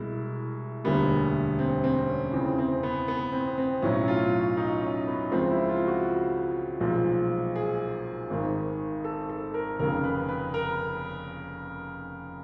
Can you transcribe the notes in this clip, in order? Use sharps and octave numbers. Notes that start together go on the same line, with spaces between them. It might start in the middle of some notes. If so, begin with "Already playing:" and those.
Already playing: C2 B2 G#3 E4
E1 D2 D3 G3 A#3 B3
C4
C4
C#4
E2 C#3 E3 C4
C4
B3
B3
C4
C4
B1 A2 F#3 C#4
F4
D#4
C#4
B3
C#2 C#3 F3 G#3 C4
E4
F4
F#4
B1 A#2 F3 G#3
G#4
G#1 G#2 D#3
A4
A4
A#4
F1 D#2 C#3 A#4
B4
B4
A#4